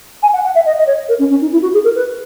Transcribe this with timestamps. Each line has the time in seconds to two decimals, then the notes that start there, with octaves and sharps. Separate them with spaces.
0.22 G#5
0.33 F#5
0.44 F#5
0.55 E5
0.65 D#5
0.78 D#5
0.86 C#5
1.08 A#4
1.19 C#4
1.29 C#4
1.41 D#4
1.52 E4
1.62 F#4
1.73 G#4
1.84 A#4
1.95 B4